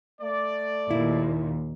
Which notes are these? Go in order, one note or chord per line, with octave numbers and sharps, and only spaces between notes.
A3 D5
D#2 A#2 E4